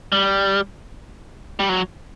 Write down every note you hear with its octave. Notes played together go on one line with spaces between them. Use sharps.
G3
G3
F#3